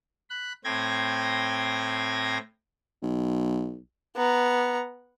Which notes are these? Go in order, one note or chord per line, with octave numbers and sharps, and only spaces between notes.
B5 F#6
A2 C4 G5 G#6 A#6
B1
B3 A#5